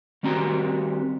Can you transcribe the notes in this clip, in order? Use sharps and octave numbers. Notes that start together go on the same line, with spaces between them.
D#3 G3 C4 F#4 A#5